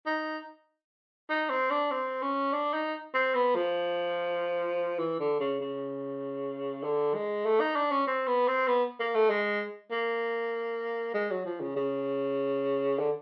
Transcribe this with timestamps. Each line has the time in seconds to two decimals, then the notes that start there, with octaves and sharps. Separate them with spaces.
0.06 D#4
1.29 D#4
1.50 C4
1.70 D4
1.91 C4
2.22 C#4
2.53 D4
2.74 D#4
3.14 C4
3.35 B3
3.55 F3
4.99 E3
5.20 D3
5.40 C#3
5.60 C#3
6.84 D3
7.14 G#3
7.45 A3
7.60 D#4
7.76 D4
7.91 C#4
8.07 C4
8.27 B3
8.48 C4
8.68 B3
9.00 A#3
9.15 A3
9.30 G#3
9.92 A#3
11.14 G#3
11.31 F#3
11.45 F3
11.61 C#3
11.76 C#3
12.99 D3